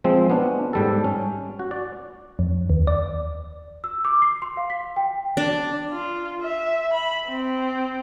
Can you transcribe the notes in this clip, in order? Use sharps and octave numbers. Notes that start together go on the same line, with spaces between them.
F3 G#3 C4
B3 C#4 D4
G#2 G3 A4
C#4
F#4
D5
F2
D#2
D5
E6
D6
C7
C6
F5
B6
G5
D4
F4
E5
B5
C4